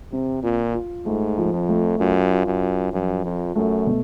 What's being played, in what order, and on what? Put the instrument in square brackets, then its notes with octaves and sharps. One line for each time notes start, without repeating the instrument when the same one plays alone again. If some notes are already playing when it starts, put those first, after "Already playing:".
[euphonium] C3 [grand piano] C4
[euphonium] A#2 [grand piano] F4
[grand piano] F4
[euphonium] G#2 [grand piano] A3
[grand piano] F3
[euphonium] F2
[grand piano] A3
[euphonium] F#2 [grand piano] F4
[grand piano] F4
[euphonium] F#2
[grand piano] F4
[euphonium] F#2 [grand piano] F3
[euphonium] F2 [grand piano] F4
[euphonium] F#2 [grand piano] A3
[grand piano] B2